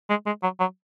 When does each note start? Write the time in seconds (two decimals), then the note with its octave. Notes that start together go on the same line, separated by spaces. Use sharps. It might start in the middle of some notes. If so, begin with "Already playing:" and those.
0.10 G#3
0.26 G#3
0.43 F#3
0.60 F#3